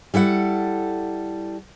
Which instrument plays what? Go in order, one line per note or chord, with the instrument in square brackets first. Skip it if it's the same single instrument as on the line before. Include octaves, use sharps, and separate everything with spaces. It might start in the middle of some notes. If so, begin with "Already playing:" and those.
[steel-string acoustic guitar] G3 E4 A4 F#5